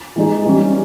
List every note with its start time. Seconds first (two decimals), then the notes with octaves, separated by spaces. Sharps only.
0.16 E3 G#3 D#4 G#4
0.46 E3 G3 C#4 G4